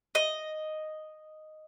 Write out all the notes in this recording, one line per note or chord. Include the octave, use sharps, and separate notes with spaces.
D#5